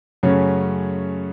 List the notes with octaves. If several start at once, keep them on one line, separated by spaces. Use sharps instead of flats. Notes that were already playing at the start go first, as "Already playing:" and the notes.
F#2 C#3 F#3 A3 C#4